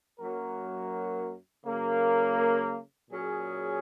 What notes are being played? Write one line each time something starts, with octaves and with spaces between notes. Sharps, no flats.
F#2 F#3 A#3 F#4 A#4
C#3 F#3 A#3
A#2 F#3 C#4 G#4